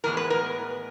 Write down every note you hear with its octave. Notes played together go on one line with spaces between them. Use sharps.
A2 E3 G#3 B3 A#4
B4
A#4